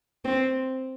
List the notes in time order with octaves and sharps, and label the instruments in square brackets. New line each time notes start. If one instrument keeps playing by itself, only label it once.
[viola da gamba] C4